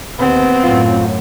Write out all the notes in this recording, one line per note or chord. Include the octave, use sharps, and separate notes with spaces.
D#2 B3 C4
F#2 A2 F4